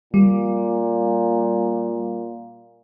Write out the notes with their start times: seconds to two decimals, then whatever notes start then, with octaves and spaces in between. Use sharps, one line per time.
0.14 A#2 G3